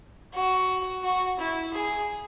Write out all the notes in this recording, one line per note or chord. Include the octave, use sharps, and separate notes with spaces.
F#4
F#4
E4
G#4